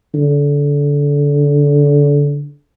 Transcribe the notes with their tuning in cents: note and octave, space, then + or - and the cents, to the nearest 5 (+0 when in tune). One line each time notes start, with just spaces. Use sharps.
D3 -25